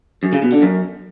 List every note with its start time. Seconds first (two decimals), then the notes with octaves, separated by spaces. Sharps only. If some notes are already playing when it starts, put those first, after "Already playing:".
0.23 F#2
0.33 C#3
0.42 B2
0.52 D3
0.62 F#2